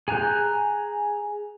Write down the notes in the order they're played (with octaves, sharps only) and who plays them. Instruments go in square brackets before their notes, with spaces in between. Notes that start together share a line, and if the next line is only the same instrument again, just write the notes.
[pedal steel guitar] G#4 G#5 A#5 F#6 G6